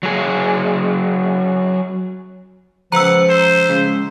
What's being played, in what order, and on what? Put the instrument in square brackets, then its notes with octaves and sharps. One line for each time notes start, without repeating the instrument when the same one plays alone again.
[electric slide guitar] F#3 G#4
[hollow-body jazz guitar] C#2 B4 [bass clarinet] F3 [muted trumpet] F#5 [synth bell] A#5 E6
[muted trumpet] C5
[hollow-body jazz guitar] C#3 G#3